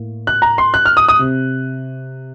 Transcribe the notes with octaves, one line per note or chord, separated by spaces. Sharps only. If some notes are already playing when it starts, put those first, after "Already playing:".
Already playing: A2 A#3
F#6
A#5
C6
F#6
F6
D#6
D#6
C3